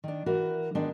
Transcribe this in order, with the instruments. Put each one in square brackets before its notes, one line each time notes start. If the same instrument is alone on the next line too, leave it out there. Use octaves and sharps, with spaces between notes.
[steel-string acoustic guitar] D#3 D4
E3 F#4 A#4
D#3 G#3 B3 D4 D#4